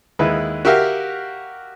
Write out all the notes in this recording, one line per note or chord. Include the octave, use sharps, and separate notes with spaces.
D#2 G#3 E4 B4
F#4 G4 A#4 E5 F5